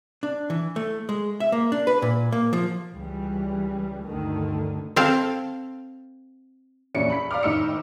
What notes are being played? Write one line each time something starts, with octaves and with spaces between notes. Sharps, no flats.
D4
E3
A3
G#3
E5
A#3
D4
B4
A#2
A#3
F3
C#2 E3 G3
D2 G2 D3 D#3 A3
C4 A4 F5
A#1 E3 C#4 D4 E4 C#7
B5 B6
D5 F5 A#5 D6 F6
G#1 A2 D#4 D6 E6 C#7